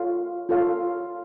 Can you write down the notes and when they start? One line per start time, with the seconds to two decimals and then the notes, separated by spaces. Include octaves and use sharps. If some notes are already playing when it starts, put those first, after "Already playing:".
Already playing: F4 A4 C#5 F5
0.49 F4 A4 C#5 F5